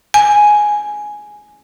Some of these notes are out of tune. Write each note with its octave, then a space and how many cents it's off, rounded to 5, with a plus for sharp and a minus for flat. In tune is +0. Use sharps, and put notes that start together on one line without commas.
G#5 +5